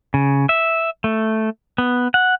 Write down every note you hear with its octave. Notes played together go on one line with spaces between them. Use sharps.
C#3
E5
A3
B3
F#5